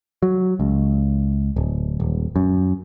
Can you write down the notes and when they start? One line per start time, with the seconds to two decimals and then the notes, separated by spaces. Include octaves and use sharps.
0.23 F#3
0.60 C#2
1.56 D1
2.00 D#1
2.36 F#2